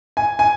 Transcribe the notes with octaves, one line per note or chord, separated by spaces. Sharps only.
G#5
G#5